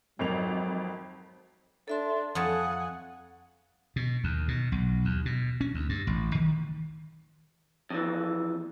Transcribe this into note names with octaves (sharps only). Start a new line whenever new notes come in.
G#1 F2 F#3 F7
D4 A4 E5 C6
F2 C#5 F#5 G#5 A5 D#6
B2
D#2
B2
B1
D#2
B2
C#4
D2
G2
A1
D#3
F2 E3